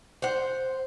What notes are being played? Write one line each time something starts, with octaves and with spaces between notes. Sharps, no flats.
C5 F#5